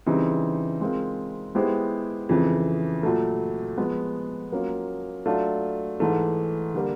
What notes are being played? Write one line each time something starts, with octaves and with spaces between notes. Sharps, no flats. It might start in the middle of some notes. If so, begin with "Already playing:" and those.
C#3 E3 G3 C4 D#4
G#3 C4 F4 A#4
G#3 B3 E4 G4 C5
F2 C#3 E3
A#2 F#3 A3
F3 G#3 B3
F#3 A#3 C#4 F4
F#3 A3 D4 F4
G#2 E3 A3
D3 G3 A#3